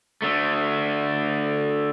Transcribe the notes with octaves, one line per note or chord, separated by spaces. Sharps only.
D3 A3